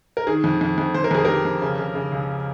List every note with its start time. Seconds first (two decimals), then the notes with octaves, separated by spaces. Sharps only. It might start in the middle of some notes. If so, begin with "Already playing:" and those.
0.17 A#4
0.27 D#3 G#4
0.44 F2
0.61 F2
0.78 F2
0.94 F2 C5
1.04 A#4
1.11 F2 G#4
1.24 F2 G4 A#4
1.45 F2
1.62 C#3
1.78 C#3
1.95 C#3
2.12 C#2